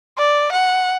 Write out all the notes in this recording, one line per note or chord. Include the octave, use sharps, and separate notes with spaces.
D5
F#5